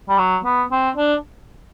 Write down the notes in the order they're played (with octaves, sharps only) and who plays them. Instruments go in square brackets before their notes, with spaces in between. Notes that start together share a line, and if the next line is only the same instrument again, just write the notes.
[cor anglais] G3
F#3
B3
C4
D4